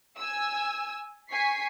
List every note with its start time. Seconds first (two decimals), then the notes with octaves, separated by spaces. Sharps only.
0.18 G#5 E6
1.31 G#5 C#6 B6 C7